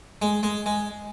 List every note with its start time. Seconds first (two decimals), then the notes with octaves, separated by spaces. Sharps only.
0.22 G#3
0.43 G#3
0.66 G#3